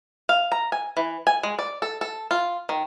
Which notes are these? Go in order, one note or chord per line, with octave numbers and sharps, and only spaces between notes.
F5
A#5
G#5
E3
G#5
G#3
D5
A4
A4
F4
D#3